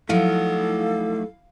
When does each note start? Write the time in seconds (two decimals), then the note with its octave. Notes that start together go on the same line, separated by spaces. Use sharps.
0.09 F3 F#3 A3 D#4 E4 A4 F5 F#5